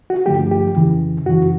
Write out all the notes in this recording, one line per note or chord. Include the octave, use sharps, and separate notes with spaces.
F#4
G2 D3 F3 A3 G4
G4
F2 C#3 E3
F#2 C#3 E3 F#4